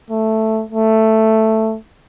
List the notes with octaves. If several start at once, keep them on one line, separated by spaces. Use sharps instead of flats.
A3
A3